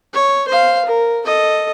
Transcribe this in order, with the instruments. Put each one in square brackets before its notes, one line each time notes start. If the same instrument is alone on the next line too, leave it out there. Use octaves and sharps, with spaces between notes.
[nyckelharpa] C#5
C5 F5
A#4
A4 D#5